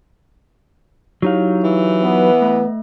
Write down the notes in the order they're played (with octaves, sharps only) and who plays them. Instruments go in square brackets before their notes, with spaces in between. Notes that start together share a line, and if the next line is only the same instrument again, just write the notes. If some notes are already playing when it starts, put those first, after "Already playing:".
[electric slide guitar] F#3 D#4 F5 [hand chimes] E4 G4 C#5
[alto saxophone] E3
[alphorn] B3
[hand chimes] A3 E5